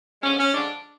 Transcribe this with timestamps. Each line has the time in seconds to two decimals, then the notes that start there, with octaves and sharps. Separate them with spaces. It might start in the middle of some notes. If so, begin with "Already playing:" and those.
0.23 D3 F3 G#3 C#4
0.39 C#4
0.54 D3 F3 G#3 D4